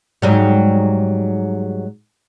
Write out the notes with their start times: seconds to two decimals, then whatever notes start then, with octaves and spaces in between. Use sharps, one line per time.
0.22 G#2 F#3 G3